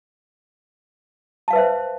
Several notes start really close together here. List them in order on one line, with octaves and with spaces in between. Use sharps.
A5 F5 B4 E5 C5